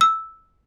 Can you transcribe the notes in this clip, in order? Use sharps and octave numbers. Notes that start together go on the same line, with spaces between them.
E6